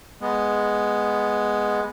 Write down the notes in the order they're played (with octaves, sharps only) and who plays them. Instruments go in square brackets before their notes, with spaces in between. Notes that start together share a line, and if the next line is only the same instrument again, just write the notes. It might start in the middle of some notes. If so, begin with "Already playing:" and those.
[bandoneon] G#3 B3